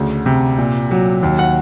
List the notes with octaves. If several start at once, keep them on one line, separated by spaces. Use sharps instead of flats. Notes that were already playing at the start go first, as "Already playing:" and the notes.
Already playing: D2 C#3
C3
A#2
F#3
D#2
F#5